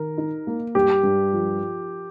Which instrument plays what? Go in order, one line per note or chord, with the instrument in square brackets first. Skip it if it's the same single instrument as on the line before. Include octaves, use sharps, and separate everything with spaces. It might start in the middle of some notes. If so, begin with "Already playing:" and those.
Already playing: [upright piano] D#3 [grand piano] A#4
[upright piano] D#4
A#3
[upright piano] G2 [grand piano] G4
[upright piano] G2
F3